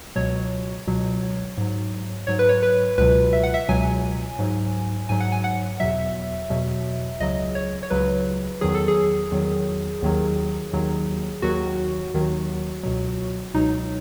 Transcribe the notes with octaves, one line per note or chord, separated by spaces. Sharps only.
C#2 B2 F#3 C#5
C#2 B2 F#3
G#2 F#3
G#2 F#3 C#5
B4
C#5
B4
C#2 B2 F#3 B4
E5
F#5
E5
C#2 B2 F#3 G#5
G#2 F#3
G#2 F#3 G#5
F#5
G#5
F#5
E2 B2 F#3 E5
E2 B2 F#3
C#2 C#3 F#3 D#5
C#5
C#5
C#2 C#3 F#3 B4
E2 D#3 F#3 G#4
A4
G#4
E2 D#3 F#3
D#2 D#3 F#3
D#2 D#3 F#3
D#2 D#3 F#3 F#4
D#2 D#3 F#3
C#2 B2 F#3
C#2 B2 F#3 D#4